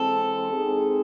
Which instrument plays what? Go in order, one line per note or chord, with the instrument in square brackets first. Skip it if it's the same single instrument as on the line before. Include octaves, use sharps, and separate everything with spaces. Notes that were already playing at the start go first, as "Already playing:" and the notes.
Already playing: [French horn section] E3 G#3 C4 [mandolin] A4
[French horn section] G#3 C4 D#4 G#4